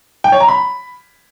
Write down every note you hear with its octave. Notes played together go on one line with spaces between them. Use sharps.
G5
C#5
A#5
B5